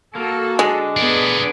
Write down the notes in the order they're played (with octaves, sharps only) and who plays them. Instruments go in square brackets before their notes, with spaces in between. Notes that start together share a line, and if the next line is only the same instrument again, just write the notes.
[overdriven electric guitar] A#3 [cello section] F#4 A4
[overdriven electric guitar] D3 [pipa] G#3
[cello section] B3 G#4 [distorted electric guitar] D4 A#4